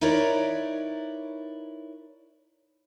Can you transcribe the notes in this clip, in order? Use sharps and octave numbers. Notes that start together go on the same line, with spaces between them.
D#4 E4 A#4 B4 C#5 D5